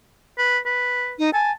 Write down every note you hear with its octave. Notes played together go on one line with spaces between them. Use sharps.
B4
B4
D#4
G#5 A5